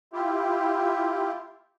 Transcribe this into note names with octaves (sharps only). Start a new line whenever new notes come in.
E4 F4 G4